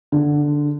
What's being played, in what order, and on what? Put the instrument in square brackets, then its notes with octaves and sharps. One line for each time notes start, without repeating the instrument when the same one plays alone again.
[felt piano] D3